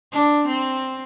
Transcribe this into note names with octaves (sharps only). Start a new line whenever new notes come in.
D4
C4